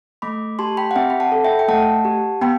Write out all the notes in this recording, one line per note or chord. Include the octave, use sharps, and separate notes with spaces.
A3 B5 D6
G4 A5 C6
G5 B5
F#5
C4 E5 G5
B5
F#5 A5
A4
E5 G5
G5
A3 F#5 A5
G4
B3 G5 B5